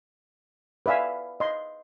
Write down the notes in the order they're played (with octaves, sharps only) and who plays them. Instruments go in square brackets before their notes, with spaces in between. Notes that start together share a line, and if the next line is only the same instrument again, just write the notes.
[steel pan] B4 D5 E5 F5 G#5
D#5 C6